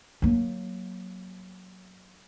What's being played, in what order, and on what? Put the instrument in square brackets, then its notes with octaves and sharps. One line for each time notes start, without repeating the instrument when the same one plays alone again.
[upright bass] F#3 A#3